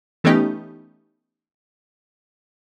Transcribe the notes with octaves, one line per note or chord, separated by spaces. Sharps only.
E3 A3 B3 C#4 D#4 G4